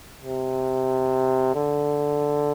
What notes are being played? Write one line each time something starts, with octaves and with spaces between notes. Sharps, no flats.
C3
D3